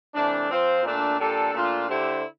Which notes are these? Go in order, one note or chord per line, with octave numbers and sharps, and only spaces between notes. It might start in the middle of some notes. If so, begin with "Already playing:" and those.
C3 E3 A3 D4
F3 C4 F4 C5
A#2 A3 D4
A#2 G3 D4 A4
A#2 A3 D4 F4
D3 A3 E4 G4 C5